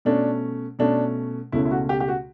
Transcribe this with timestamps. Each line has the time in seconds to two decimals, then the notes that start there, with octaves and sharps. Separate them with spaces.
0.05 B2 A3 C#4 D4
0.79 B2 A3 C#4 D4
1.52 C#2 B2 A3 C#4 E4
1.65 E4
1.71 F#4
1.89 G4
2.00 G4
2.08 F#4